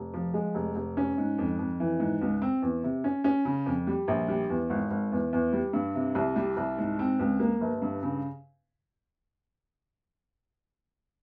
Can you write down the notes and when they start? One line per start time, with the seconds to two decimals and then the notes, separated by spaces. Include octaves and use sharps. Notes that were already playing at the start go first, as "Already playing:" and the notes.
Already playing: F1
0.14 F3
0.34 G#3
0.55 F1
0.75 F1
0.97 C#4
1.18 G#2
1.38 F2
1.59 F2
1.80 E3
2.00 G#2
2.21 C#2
2.42 C4
2.62 E2
2.83 C3
3.04 C#4
3.24 C#4
3.45 C#3
3.66 F2
3.87 G3
4.08 A#1
4.28 G3
4.50 E2
4.70 G#1
4.91 G#1
5.12 E2
5.33 E2
5.53 G3
5.73 G2
5.95 C3
6.15 C2
6.36 G3
6.57 C2
6.78 G#2
6.99 C4
7.19 C#2
7.40 A#3
7.61 G1
7.82 G2
8.03 C#3